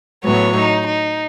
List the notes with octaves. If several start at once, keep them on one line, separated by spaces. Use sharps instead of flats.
A2 F#3 B3 C#5
D#4
D#4